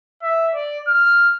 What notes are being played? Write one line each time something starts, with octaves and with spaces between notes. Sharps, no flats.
E5
D5
F6